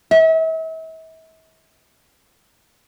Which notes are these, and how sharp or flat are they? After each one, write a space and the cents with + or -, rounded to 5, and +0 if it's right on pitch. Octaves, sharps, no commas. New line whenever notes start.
E5 -40